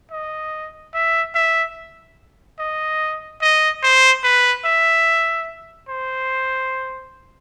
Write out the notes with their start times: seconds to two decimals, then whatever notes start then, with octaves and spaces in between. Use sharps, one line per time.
0.11 D#5
0.94 E5
1.35 E5
2.59 D#5
3.41 D#5
3.83 C5
4.24 B4
4.65 E5
5.89 C5